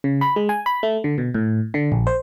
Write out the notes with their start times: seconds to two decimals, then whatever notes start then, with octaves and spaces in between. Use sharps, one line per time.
0.04 C#3
0.21 B5
0.36 G#3
0.49 G#5
0.66 B5
0.83 A3
1.04 D3
1.18 B2
1.35 A2
1.74 D3
1.92 A#1
2.07 C5